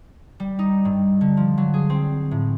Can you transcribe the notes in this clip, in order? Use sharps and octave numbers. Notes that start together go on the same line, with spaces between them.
G3
D#4
G2
D3
F3
F#3
G#4
C4
A2